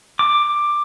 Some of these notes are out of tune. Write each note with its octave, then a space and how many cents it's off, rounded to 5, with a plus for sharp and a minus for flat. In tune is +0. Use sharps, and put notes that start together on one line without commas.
D6 +10